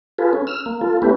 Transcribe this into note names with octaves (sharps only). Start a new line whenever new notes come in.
F4 G#4 A4 B4
C#4
E6 F6
A#3
F4 A4
A3 B3 C#4 E4 G4 B4